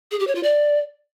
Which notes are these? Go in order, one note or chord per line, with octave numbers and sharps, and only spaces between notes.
G#4
G4
C#5
F4
D5